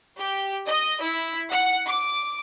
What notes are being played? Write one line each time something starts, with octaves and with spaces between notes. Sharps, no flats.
G4
D#5
E4
F#5
D6